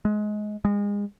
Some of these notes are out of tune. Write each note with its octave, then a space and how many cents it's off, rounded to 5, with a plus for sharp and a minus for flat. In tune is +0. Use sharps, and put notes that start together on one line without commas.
G#3 +20
G#3 -30